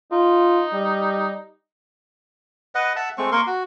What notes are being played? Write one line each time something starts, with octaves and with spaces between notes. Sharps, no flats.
D#4 F4
G3
B4 D#5 F#5
E5 F#5 A5
G#3 A3 C4 C#6
A#3 A#4 C6 C#6
F#4